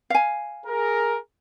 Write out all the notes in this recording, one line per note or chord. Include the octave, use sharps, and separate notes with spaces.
F5 G#5
G#4 A#4